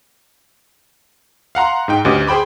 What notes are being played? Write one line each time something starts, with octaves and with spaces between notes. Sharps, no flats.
F5 F#5 A#5 C6
G#2 D#4 G5
D2 C#4 G4 B4 D#5 D6
G#4 C5 G5 B5 D6